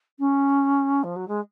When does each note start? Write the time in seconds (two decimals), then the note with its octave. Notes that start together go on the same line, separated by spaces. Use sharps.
0.19 C#4
1.03 F3
1.16 F#3
1.28 G#3